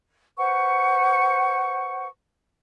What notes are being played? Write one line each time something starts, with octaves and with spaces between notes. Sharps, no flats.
B4 C5 F#5 C#6